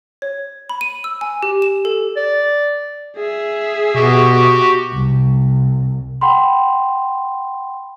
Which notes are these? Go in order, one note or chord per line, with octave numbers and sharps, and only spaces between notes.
C#5
B5
D#7
E6
G#5
G4
E7
A4
D5
G#4 E5
B2 B3 F#4 G4
C2
F#5 G5 B5 C6